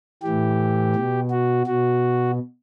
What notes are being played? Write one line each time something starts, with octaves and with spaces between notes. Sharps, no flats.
A2 E3 G4
B2
F#4
B2 F#4